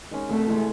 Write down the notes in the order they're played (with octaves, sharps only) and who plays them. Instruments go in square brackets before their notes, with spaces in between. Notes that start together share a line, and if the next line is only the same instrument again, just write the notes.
[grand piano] D#3 G#3 C#4
[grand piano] C2 [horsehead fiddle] A3
[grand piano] C3 E3 G#3